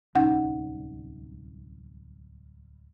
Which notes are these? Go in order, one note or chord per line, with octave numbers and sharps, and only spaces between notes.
D1 C2 C#4 D#4 F#5